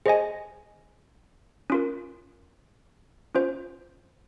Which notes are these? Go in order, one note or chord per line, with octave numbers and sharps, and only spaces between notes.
G#4 C5 D#5 G#5
C#4 F4 A#4
C#4 F4 C5